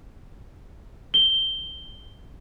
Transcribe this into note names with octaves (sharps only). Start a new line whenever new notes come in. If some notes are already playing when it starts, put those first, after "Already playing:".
G7